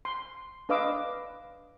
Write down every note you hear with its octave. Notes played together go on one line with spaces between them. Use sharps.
C6
D4 B4 D#5 F5 D6 E6